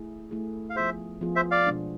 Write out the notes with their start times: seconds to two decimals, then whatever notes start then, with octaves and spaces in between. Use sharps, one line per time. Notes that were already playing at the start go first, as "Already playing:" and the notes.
Already playing: A3 E4 G#4
0.31 A3 E4 G#4
0.70 F5
0.76 F3 B3 F4 G#4 C5 E5
1.21 F3 B3 F4 G#4
1.36 C5 E5
1.51 D5 F5
1.67 B2 G#3 D4